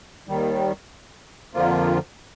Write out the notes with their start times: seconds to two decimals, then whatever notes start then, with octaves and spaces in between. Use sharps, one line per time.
0.28 D#2 D#3 G3
1.54 F2 D3 F3 A#3 F4